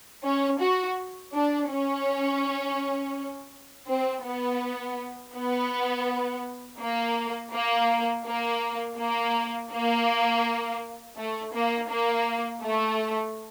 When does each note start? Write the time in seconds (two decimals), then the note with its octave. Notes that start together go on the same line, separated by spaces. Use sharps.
0.24 C#4
0.61 F#4
1.34 D4
1.70 C#4
3.88 C4
4.25 B3
5.35 B3
6.80 A#3
7.53 A#3
8.26 A#3
8.98 A#3
9.72 A#3
11.18 A3
11.54 A#3
11.90 A#3
12.63 A3